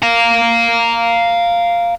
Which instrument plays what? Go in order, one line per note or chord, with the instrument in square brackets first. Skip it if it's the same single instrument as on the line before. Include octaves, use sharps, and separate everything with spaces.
[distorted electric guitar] F5 A#5